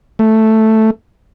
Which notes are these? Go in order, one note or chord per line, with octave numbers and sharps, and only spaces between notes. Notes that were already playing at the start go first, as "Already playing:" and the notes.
A3